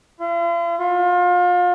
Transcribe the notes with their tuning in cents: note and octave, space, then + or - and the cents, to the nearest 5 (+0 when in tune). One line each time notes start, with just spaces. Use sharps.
F4 -45
F4 +30